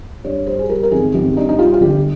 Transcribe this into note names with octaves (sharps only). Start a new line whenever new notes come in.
G2 C#5
G3 C5
G#4
G3 A#4
A#4
G#1 G#4
G#1 G4
G2 D#4
D#4
G3 F4
F4
G1 G4